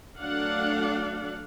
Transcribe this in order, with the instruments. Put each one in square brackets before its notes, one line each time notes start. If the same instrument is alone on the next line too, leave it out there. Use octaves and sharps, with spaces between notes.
[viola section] F#3 A3 D4 D5 F5 F#5